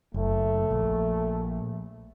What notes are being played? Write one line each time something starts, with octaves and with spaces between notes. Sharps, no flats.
F#1 A3
A#1